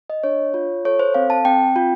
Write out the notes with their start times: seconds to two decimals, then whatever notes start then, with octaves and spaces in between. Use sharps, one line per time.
0.10 D#5
0.23 D4 C#5
0.54 F4
0.85 A4 C#5
0.99 C5
1.14 C4 F5
1.30 A5
1.45 C4 G5
1.76 F4